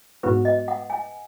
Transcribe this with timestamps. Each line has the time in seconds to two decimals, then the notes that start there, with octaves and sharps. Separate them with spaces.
0.23 G#2 F#3 B3 F#4 B4
0.45 D#5
0.68 F#5
0.90 G#5